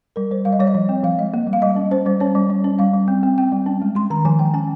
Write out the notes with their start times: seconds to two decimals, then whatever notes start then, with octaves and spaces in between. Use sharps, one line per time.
0.16 G3 A#4
0.31 G3 C5
0.45 G3 F5
0.53 D#5
0.60 G3 C#5
0.67 D#5
0.75 F3
0.89 C4
1.04 F3 F5
1.18 G#3 D#5
1.34 A#3
1.47 G3
1.53 F5
1.62 G3 D#5
1.76 C#4
1.91 C#4 C5
2.06 G3 C5
2.20 C#4 C#5
2.35 G3
2.50 G3
2.64 C#4
2.79 G3 F5
2.94 G3
3.08 C4
3.23 C4
3.38 C4 G5
3.52 G3
3.66 C#4
3.82 G#3
3.95 G#3 C6
4.10 D#3 A#5
4.25 F3 G#5
4.39 F3 G5
4.54 C#4 G#5